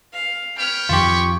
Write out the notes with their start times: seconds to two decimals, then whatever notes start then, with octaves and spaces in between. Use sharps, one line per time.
0.13 F5
0.58 B4 C#5 G5 F6
0.89 F2 D#3 F3 F4 G4 C#6